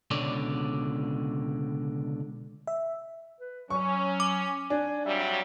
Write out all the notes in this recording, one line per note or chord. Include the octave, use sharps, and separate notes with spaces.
C#2 B2 D3 C#5 D5
E5
B4
F#3 C#4 C#6
D6
D4 G#5
F2 F#3 G3 E5